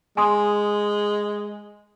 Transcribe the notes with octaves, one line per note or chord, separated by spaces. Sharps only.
G#3 G#5 C6 D#6